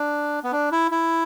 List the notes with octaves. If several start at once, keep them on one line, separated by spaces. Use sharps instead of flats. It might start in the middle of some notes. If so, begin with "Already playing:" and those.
Already playing: D4
B3
D4
E4
E4